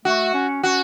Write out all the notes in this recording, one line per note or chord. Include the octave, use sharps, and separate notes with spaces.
A3 F#4
C#4
C#4 F#4